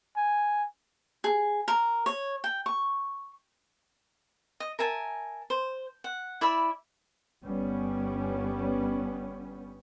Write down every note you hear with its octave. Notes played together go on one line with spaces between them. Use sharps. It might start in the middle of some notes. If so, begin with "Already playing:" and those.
G#5
G#4
A#4
C#5
G5
C#6
D#5
A#4 E5 G#5 A5
C5
F#5
E4 D5 E5 B5
G1 G3 B3 C#4